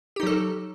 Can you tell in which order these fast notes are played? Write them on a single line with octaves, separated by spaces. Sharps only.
G4 D#4 F#3 A4